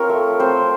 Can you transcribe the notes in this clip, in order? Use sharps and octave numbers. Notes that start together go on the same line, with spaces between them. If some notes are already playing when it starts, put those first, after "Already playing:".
Already playing: C4 F4 A#4 C#5
A3
C4 C5